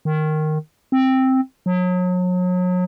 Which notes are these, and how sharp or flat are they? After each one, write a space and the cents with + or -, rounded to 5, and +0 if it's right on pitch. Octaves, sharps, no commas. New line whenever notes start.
D#3 -10
C4 +5
F#3 -35